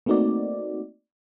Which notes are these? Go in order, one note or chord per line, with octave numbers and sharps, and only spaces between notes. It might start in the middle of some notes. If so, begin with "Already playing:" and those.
A3 A#3 C4 D#4 F#4 D5